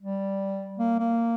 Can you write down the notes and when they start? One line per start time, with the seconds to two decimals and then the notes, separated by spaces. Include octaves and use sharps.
0.03 G3
0.79 A#3
0.99 A#3